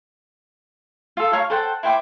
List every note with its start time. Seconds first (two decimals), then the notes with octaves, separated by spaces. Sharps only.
1.17 F4 A4
1.33 C#5 F5 A#5 C#6
1.50 A4 C5 F#5 G5
1.83 E4 C5 G5 D6